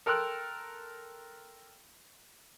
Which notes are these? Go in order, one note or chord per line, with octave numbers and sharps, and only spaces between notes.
A4 A#4 G5 C6 E6 F#6